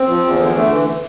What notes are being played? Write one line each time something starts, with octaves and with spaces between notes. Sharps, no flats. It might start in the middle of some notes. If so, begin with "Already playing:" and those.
Already playing: C4
F3
E2
D3
A3
E3